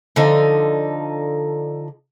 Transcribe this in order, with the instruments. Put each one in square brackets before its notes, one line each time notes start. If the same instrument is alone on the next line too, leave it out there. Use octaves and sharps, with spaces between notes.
[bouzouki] D3 F3 D#4